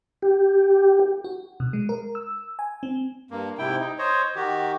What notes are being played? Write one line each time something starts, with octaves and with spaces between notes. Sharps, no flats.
G4
F#4
B2
G#3
A#4
E6
G#5
C4
G2 A#3
G#2 C3 E4 G5
D#4
C5 C#5 D#5
D#3 F#4 G4